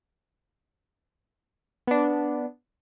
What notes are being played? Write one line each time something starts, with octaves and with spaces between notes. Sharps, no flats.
B3 D4